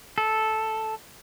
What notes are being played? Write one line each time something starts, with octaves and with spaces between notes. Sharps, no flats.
A4